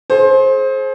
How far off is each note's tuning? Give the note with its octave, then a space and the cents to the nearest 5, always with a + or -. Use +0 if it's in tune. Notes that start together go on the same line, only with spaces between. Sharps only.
G#4 +40 C5 +20